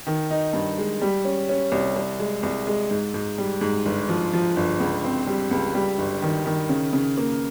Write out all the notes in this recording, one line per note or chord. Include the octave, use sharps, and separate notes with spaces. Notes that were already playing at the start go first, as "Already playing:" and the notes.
D#3
D#4
G2
G#3
G3
C#4
C#4
C2
C2
G#3
C2
G#3
G#2
G#2
G3
G#2
G1
F3
F3
G1
C#2
C4
G3
C#2
G3
G1
D#3
D#3
C#3
C#3
A#3